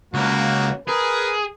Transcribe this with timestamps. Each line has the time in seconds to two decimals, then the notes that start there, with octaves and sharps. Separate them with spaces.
0.14 C#2 A#3 F#4
0.87 G#4 A#4 B4